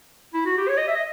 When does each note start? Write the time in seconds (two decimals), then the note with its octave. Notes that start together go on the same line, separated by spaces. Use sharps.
0.34 E4
0.46 F#4
0.58 G4
0.69 C#5
0.78 D#5
0.88 E5
0.96 D#5